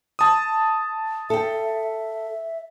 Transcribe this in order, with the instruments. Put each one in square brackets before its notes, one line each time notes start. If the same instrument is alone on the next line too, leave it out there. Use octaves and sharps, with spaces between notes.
[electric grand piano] A5 D#6
[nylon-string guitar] A4 G5 [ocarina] E5